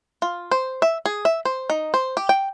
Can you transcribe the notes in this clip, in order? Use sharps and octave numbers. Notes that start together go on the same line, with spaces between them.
F4
C5
E5
G#4
E5
C5
D#4
C5
G4
G5